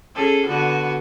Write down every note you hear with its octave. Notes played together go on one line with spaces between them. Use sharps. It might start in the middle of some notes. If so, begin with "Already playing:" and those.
C#4 G#4 A4
D3 B3 F#4